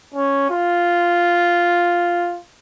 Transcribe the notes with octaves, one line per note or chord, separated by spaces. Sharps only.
C#4
F4